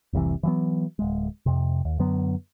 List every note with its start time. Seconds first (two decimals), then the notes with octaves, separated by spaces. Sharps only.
0.13 F1 C2 C3 E3
0.43 E3 F#3 B3
0.99 D1 G#3
1.46 F2 C3
1.85 D#2
1.99 F#2 D3 F#3 B3